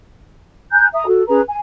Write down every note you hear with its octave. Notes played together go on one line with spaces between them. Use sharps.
G#5 A#5 F#6 G6
E5 A#5 D#6
F#4 A4
C#4 G#4 B4 A#5
G#5